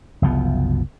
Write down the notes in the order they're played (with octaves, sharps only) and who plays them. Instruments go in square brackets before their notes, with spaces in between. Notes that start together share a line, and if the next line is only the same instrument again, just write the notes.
[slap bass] F#1 C2 F3 B3